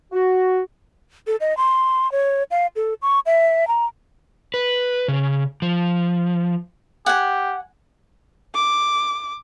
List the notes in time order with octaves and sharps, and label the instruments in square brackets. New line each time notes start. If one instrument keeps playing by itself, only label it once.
[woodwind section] F#4
[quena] A4
D#5
C6
C#5
F5
A4
C#6
E5
A#5
[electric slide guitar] B4
C#3
F3
[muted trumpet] G4 [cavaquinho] F#5 G#5
[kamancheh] D6